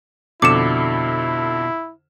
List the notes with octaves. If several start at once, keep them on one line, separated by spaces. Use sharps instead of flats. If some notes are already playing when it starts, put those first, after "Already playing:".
F2 B2 D3 E4 D6 C#7 E7